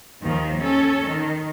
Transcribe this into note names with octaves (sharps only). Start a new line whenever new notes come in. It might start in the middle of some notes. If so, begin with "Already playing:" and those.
D#2 D#3 F3
C#4 A4
D#3